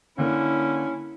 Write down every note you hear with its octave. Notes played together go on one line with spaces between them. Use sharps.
D3 A#3 C#4 E4